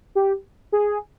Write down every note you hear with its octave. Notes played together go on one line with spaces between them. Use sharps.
G4
G#4